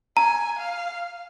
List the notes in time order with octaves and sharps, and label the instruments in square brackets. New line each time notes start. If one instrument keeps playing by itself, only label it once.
[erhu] G#5 [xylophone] A#5
[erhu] F5